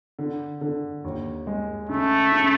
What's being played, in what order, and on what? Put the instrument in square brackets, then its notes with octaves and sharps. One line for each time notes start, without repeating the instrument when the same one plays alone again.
[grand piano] D3
D3
D#2
G#3
[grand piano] C#3 [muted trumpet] A3
[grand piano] C#3